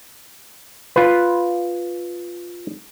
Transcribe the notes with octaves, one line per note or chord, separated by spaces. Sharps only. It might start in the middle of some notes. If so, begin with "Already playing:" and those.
F4 B4